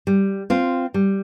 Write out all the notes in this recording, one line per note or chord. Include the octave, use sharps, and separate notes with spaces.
G3
C4 F4
G3